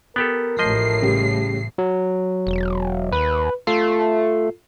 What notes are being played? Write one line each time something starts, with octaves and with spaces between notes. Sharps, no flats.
B3 G4 A4 A#4
A1 A2 F3 D#5 C7
C#3 G3
F#3
E1
D#2 B4
A3 F4 A4 C7